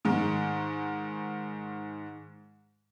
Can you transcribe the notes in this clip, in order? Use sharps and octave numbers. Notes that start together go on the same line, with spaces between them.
G#2 D#3